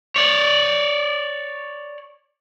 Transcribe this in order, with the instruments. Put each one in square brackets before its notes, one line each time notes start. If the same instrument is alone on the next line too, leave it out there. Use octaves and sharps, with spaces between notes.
[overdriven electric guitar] C#5 D5